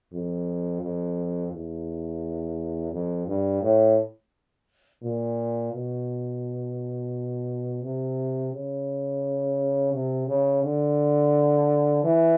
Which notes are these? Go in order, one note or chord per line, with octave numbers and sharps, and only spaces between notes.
F2
F2
E2
F2
G2
A2
A#2
B2
C3
C#3
C3
C#3
D3
E3